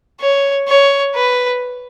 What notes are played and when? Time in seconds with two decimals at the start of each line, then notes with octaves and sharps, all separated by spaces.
0.20 C#5
0.68 C#5
1.15 B4